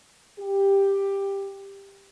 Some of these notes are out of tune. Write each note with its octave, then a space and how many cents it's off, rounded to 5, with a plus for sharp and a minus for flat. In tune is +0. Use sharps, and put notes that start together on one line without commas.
G4 +10